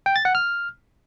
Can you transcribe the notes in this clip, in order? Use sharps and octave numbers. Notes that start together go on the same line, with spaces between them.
G5
A6
F#5
F6